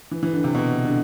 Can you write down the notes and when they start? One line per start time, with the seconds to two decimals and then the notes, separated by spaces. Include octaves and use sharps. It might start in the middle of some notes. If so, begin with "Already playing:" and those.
0.11 E3
0.23 E3
0.33 D3
0.44 C3
0.55 B2
0.85 D3